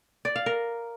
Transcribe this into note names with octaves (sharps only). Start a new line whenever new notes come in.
D5
F5
A#4